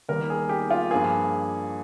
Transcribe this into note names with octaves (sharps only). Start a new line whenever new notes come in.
D#2 D#3 G3 A#4
G#4
G4
F4
G2 F3 A#3 G#4